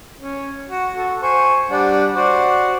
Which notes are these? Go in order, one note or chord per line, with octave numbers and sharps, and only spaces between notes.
C#4
F#4
F#4 A4
C5 G#5 C#6
G3 D4 F#5
F#4 C5 D5